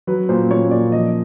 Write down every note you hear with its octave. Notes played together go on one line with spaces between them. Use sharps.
F#3 B4
A#2 C5
A#2 C#5
A#2 D5
F3 D#5